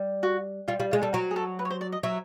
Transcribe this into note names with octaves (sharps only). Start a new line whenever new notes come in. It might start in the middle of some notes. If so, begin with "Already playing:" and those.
Already playing: G3
F#4
G3 F4
G3 F4
G#3 F4
G3 A4
F#3 A#4
G#4
A4
B4
C#5
C5
D5
D#5
F#3 E5